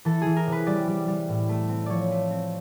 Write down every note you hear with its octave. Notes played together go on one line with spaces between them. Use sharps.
E3 A4
E3 G#4
A#4
C3
B4
G3 D5
G3
G3
A2
A3
C4
F3 C#5 D5
A3
C4